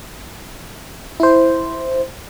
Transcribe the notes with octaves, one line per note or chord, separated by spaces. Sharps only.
E4 C5